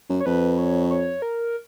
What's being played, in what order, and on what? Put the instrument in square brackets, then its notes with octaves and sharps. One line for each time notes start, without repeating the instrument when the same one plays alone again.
[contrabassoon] F#2
[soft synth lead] C#5
[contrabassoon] F2 [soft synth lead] B4
[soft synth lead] C#5
C#5
A#4